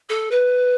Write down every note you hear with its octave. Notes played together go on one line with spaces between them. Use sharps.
A4
B4